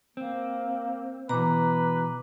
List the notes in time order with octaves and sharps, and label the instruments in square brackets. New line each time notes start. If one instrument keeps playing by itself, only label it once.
[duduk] A#3 [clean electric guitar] C4
[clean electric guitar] B2 E3 [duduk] B4 [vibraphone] A#5 D6